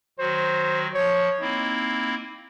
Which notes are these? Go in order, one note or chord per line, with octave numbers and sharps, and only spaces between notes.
D#3 F#3 F#4 C5
F3 C#5
A#3 C4 D#4 E4